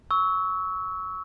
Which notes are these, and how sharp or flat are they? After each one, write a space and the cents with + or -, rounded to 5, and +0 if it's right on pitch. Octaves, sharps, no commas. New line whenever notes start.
C#6 +15 E6 -20